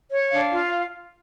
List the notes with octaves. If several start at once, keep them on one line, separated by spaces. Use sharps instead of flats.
C#5
D4 F5
F4